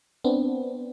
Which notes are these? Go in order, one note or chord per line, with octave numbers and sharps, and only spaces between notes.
B3 C4 D4